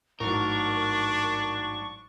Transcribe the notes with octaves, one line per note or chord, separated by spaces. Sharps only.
A1 G#2 F#3 D4 A#4 C#6